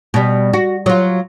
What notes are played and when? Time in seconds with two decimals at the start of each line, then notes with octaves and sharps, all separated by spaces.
0.14 B2 G3
0.53 F#4
0.86 F#3 F4